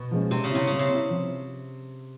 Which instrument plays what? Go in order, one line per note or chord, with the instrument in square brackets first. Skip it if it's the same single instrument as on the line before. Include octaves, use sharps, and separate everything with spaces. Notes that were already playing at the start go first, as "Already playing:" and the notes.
Already playing: [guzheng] B2
[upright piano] F3 G#3 C#4
[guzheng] C3 [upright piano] G3
[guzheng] C#3
[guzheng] C3 [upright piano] C4 E4
[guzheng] C#3 [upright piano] G3
[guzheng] C3
[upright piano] C4 E4
F3